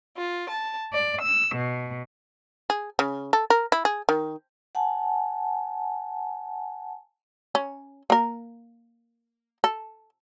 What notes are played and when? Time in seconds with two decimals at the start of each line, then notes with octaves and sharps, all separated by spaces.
0.16 F4
0.48 A5
0.93 D5
1.23 E6
1.56 B2
2.70 G#4
2.99 C#3
3.33 A4
3.50 A#4
3.72 E4
3.85 G#4
4.09 D#3
4.75 F#5 G#5 A5
7.55 C#4
8.10 A#3 A#4
9.64 A4